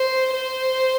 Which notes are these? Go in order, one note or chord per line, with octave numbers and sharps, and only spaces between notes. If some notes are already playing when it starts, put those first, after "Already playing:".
Already playing: C5
C5